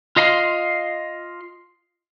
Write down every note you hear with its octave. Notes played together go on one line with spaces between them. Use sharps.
F4 D#5 F5 A#5 C6